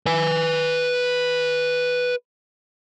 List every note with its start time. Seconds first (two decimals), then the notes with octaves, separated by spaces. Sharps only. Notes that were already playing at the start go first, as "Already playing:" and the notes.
0.06 B4 G#5